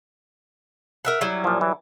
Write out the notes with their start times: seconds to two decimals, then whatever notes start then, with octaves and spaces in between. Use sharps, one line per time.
1.05 A#4 E5 F#5
1.21 F#3 G3 E4
1.44 A#2 F3
1.61 E3